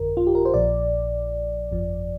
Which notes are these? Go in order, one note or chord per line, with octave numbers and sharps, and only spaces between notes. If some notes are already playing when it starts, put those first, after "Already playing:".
Already playing: G1 F2 D3 A#4
F4
G4
A#4
C5
A#1 A#2 F3 D5
G1 F2 F3